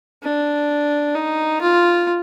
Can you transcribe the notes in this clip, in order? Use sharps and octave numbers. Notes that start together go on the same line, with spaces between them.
D4
D#4
F4